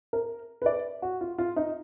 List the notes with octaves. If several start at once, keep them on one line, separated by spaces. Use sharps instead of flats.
A#4
B4
D5
F#4
F4
F4
D#4